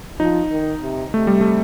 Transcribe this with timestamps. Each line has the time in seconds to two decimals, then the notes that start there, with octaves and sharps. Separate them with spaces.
0.20 F3 D#4
0.51 D#3
0.82 C3
1.14 C3 A3
1.27 G3
1.41 A3